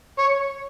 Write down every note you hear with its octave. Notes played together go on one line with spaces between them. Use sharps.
C#5